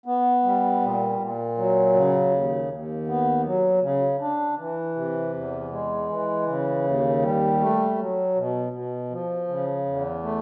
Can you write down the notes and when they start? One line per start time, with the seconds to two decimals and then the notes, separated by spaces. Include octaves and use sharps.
0.06 B3
0.43 G3
0.82 A#2
1.19 A#2
1.57 F#3
1.94 C#3
2.33 D#2
2.70 D#2
3.07 B3
3.45 F#3
3.82 C#3
4.21 D4
4.58 E3
4.96 C3
5.34 E2
5.71 G#3
6.08 E3
6.46 C#3
6.84 D#2
7.22 G3
7.60 A3
7.98 F#3
8.35 B2
8.73 B2
9.10 F3
9.48 C#3
9.85 E2
10.23 A3